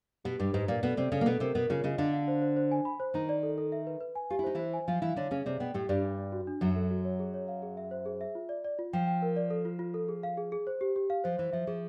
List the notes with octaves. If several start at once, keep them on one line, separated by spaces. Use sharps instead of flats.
B2 B3 G4
G2 G3 G4
G#2 G#3 B4
A#2 A#3 D5
B2 B3 A4
C3 C4 D5
C#3 C#4 A4
A#3
B2 B3 A4
C3 C4 A#4
B2 B3 A#4
C#3 C#4 F4
C#3 C#4 D#5
D3 D4 F5
F5
C5
C5
C5
G#5
B5
C5
D#3 D#4 A#5
D5
A4
A4
E5
B4
B4
G#5
F4 G4
E4
D#4 C5
E3 E4 C5
G#5
F3 F4 F5
E3 E4 F5
D3 D4 C#5
C#3 C#4 G#4
C3 C4 D5
B2 B3 G5
A2 A3 G4
G2 G3 D5
D4
D4
F#4
D4
F#2 F#3 E5
A4
F#4
C#5
G#4
C#5
F5
G#4
E5
C5
G#4
E5
F4
D5
D5
F4
F3 G5
G5
A#4
D5
A4
F4
F4
A4
G#4
F5
G#4
G#4
C5
G4
G4
F5
F3 C5
E3 C5
F3 E5
F3 G#4